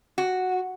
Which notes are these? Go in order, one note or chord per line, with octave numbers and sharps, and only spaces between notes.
F#4